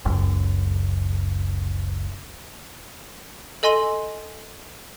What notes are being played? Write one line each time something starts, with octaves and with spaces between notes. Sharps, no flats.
F#1 C#2 F#2
A4 D#5 G#5 C6 A#6 D#7